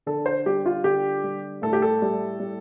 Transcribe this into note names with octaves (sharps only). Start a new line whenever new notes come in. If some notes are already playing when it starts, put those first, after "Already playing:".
D3 A4
C5
G3 G4
F4
D3 G4
G3
A2 A4
G4
A4
G3
G3